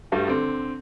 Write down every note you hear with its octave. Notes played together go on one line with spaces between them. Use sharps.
G2 G3 A3 F#4
D3 C4